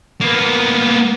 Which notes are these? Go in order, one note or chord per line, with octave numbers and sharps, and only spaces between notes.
A#3 B3